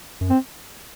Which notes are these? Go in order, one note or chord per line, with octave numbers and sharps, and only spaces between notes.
F#2
C4